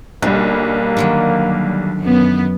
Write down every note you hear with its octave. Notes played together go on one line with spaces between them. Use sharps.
B1 D3 G3 A#3
D3 D#3 F#3
F#2 B3